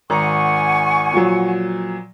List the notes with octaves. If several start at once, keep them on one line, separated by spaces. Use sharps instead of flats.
G#1 F#5 G#5 A#5 C#6
A#2 F3 F#3